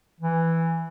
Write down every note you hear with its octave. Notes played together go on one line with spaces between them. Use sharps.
E3